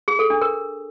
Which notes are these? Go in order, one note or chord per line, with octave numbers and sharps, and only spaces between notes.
G#4
A4
D4
A#4